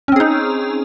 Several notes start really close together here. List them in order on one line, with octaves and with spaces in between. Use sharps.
C#4 C4 G#4 D#4